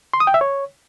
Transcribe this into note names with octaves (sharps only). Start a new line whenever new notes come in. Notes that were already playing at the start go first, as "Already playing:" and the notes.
C6
D#6
G5
E5
C#5